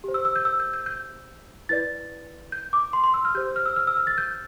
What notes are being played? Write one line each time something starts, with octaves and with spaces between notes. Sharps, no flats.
G4 C5
E6
E6
G6
E6
G6
G6
G6
E4 B4 D5 A6
G6
D6
C6
C6
E6
F6
G4 C5 G6
F6
E6
F6
E6
F6
A6
G6